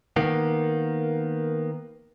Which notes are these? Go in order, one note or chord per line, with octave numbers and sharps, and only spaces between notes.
D#3 A#3 B3